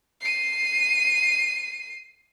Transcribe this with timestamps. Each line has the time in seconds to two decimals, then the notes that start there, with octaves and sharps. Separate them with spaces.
0.21 C7 D#7